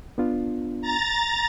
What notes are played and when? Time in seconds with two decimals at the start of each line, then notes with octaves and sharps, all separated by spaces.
0.18 B3 D4 F4
0.81 A#5 A6